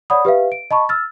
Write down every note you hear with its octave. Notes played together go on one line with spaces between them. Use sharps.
C#5 D5 F#5 B5 D#6
G4 B4 E5 F5
D7
D#5 A5 B5 C#6
E6 F6 A6